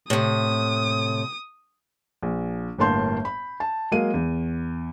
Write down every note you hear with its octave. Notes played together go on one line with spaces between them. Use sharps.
A2 C3 D#6
A#1
G1 A2 A#3 A5 C6 G6
B5
A5
F#3 G#3 A#3 F5 D#7
E2